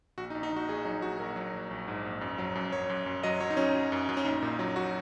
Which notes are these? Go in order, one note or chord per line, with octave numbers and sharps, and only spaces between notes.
A#1 F#4
D#4
A#1
D#4
A#1 F#4
A#1 G#4
F#3 D#4
A#1 F#4
A#1 A#4
F#3
A#1
A#1
G#2
A#1
F#2
F#3
F#2
F#2 C#5
F#2
F#2
F#3 D#5
F#3 C#5
D#4
F#3 C#4
F#3
F#2
F#2
C#4
A#1 D#4
A#2
F#3
F#3 F#4